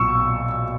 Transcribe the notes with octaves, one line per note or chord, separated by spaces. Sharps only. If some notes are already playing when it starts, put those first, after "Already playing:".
Already playing: B1 A#2 C#6 E6